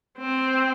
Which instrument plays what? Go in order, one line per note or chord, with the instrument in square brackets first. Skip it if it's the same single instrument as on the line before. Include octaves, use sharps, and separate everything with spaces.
[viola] C4